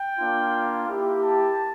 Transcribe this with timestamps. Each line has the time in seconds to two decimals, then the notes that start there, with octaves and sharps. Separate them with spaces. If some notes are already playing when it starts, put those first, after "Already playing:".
Already playing: G5
0.19 A#3 D4 F4
0.87 A#3 E4 G4
1.22 A5